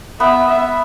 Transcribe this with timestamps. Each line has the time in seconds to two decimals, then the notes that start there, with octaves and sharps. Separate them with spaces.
0.20 B3 E5
0.48 E5